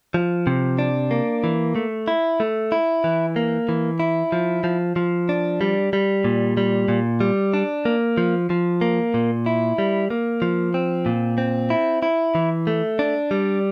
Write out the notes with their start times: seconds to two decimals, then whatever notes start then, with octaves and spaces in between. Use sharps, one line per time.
0.14 F3
0.47 C3
0.79 D4
1.11 A#3
1.44 E3
1.75 A3
2.08 E4
2.40 A3
2.72 E4
3.04 E3
3.36 A#3
3.69 E3
4.00 E4
4.32 F3
4.64 F3
4.96 F3
5.29 D4
5.61 G3
5.93 G3
6.24 A#2
6.57 G3
6.88 A#2
7.20 G3
7.54 D4
7.85 A#3
8.17 F3
8.50 F3
8.81 A#3
9.14 A#2
9.46 E4
9.78 G3
10.10 A#3
10.42 F3
10.74 C4
11.06 A#2
11.38 C4
11.70 E4
12.03 E4
12.35 E3
12.67 A3
12.99 D4
13.31 G3